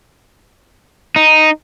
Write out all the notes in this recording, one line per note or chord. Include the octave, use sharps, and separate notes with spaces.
D#4